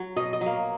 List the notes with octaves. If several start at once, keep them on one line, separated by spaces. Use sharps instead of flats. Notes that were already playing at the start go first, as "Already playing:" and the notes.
Already playing: F#3
B2 D#5
D#5
F#3
A#3